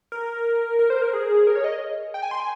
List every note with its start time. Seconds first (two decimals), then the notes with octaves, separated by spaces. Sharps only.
0.12 A#4
0.79 A#4
0.90 C5
1.02 A#4
1.13 G#4
1.47 A#4
1.55 C#5
1.64 D#5
2.14 G5
2.22 G#5
2.31 C6
2.40 G#5